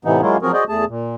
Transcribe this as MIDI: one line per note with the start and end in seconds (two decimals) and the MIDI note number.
0.05 0.21 45
0.05 0.21 48
0.05 0.21 52
0.05 0.21 59
0.05 0.21 63
0.21 0.37 54
0.21 0.37 56
0.21 0.37 58
0.21 0.37 61
0.21 0.37 64
0.21 0.37 65
0.42 0.52 53
0.42 0.52 54
0.42 0.52 60
0.42 0.52 66
0.42 0.52 68
0.42 0.52 70
0.53 0.64 66
0.53 0.64 68
0.53 0.64 72
0.53 0.64 74
0.53 0.64 75
0.69 0.85 40
0.69 0.85 57
0.69 0.85 68
0.69 0.85 81
0.88 1.15 46